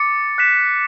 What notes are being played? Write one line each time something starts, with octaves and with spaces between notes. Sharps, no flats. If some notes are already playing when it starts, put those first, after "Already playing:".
Already playing: D6 A6 C#7
F#6 B6 E7